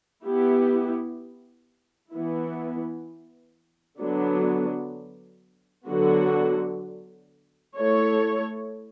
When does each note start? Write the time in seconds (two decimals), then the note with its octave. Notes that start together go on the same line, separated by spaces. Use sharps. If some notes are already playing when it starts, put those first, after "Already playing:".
0.24 B3 E4 G4
2.12 E3 B3 E4
4.00 D3 F#3 B3 D4
5.88 D3 F#3 B3 F#4
7.76 A3 E4 A4 C#5